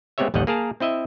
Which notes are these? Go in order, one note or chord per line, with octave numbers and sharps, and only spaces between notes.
G#3 B3 C4 G4 C#5 E5
A1 D#2 G3 D#5 F#5
A#3 G#4 A#4 A5
C4 E4 D#5 E5